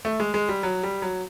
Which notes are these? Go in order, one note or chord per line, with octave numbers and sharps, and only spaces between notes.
A3
G#3
G#3
G3
F#3
G3
F#3